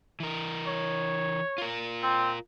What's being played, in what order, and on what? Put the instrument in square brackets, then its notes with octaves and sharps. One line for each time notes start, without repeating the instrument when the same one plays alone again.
[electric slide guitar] E3 A#4
[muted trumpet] C#5
[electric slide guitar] F4 A#4
[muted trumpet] C4